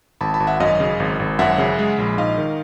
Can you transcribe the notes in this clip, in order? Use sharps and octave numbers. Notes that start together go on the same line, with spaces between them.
G#1 A5 B5
A5 B5
G#1
E5 F#5
F#2 D#5 F5
C#3
G#1
G#1
F#2 E5 F#5
C#3
G#3
A#1
G#2 D#5 F5
D#3